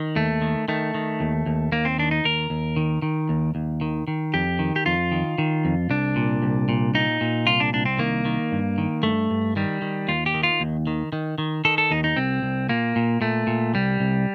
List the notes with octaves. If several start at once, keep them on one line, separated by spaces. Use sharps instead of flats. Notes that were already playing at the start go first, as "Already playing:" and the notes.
Already playing: D#3
D#2 A3
D#3
D#3 A3
D#3
D#2
D#2
D#2 A#3
C4
D#3 D4
D#4
D#2 A#4
D#2
D#3
D#3
D#2
D#2
D#3
D#3
F2 G4
D#3
G4
F2 F4
D#3
D#3
F2
C2 D4
A#2
C2
A#2
A#2 D#4
A#2
C2 F4
D4
C2 D4
C4
D#3 A#3
D#3
G2
D#3
G2 A3
G2
D#3 G3
D#3
D#2 F4
G4
D#3
F4
D#2
D#3
D#3
D#3
D#3 A4
A4
D#2 D#4
D#4
C2 C4
C2
A#2 A#3
A#2
A#2 A3
A#2
C2 G3
C2